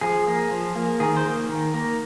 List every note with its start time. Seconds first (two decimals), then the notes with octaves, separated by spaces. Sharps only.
0.01 F3 G#4
0.27 A#3
0.51 F3
0.75 A#3
1.00 D#3 G#4
1.17 C5
1.25 A#3
1.49 D#3
1.74 A#3